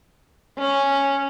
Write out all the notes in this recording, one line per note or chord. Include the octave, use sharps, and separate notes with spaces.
C#4